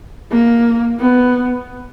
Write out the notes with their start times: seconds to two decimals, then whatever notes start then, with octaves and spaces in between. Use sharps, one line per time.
0.31 A#3
0.99 B3